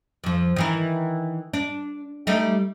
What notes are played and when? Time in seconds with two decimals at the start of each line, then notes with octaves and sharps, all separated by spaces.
0.24 F2 F3
0.56 D#3 E3 A#4
1.53 D4
2.27 G3 A3 D#4